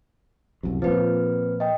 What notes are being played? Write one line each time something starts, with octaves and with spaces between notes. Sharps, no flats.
C2 F#2
A#2 F3 C4 B4
D#5 G5